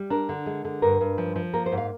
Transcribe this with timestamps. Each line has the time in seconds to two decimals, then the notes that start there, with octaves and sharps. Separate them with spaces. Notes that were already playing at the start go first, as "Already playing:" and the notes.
Already playing: G3
0.10 D4 A#4
0.29 D3
0.46 G#3
0.65 D3
0.82 G2 A#4
1.01 G2
1.18 F3
1.36 F3
1.54 A#3 A#4
1.66 C5
1.72 G#2
1.78 F5